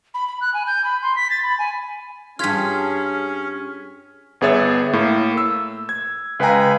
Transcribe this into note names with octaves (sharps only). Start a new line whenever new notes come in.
B5
B5
F#6
G#5
G6
B5
C6
B6
A6
B5
G#5
G2 C#4 F4 G#4 F6 G#6 B6
G1 B3 G#4 C#5 E5 A6
A2 A#3
E6
G#6
C#2 B4 F5 G5 G#5 A#5